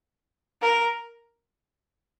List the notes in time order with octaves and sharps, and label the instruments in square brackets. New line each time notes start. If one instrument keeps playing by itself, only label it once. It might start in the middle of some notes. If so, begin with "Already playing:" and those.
[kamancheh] A#4